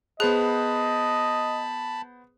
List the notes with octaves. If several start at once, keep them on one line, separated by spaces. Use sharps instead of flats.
B3 G#4 C5 D#5 A5 B5 F#6